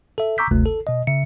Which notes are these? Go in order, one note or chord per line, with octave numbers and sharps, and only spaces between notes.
A4 E5
A#5 C#6 D6 E6 G6 B6
G1 D2 C3 A3
A4
B2 D#5
C#3 E5 C#7